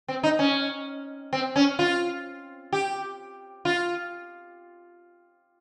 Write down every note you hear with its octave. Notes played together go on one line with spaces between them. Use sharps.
C4
D#4
C#4
C4
C#4
F4
G4
F4